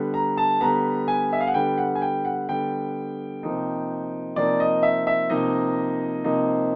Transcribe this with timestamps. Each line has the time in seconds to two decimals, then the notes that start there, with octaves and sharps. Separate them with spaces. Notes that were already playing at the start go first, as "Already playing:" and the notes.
Already playing: D3 G3 B3
0.14 A#5
0.37 A5
0.60 D3 G3 B3 A#5
1.08 G#5
1.33 E5
1.40 F5
1.47 F#5
1.54 D3 G3 B3 G5
1.78 F#5
1.95 G#5
2.02 G5
2.25 F#5
2.49 D3 G3 B3 G5
3.43 C3 F3 A#3 D#4
4.36 C3 F3 A#3 D#4 D5
4.60 D#5
4.83 E5
5.07 E5
5.30 C3 F3 A#3 D#4 D#5
6.24 C3 F3 A#3 D#4